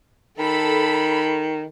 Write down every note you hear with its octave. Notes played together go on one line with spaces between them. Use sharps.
D#3 A4 B5